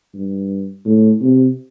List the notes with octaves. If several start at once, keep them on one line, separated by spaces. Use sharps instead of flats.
G2
A2
C3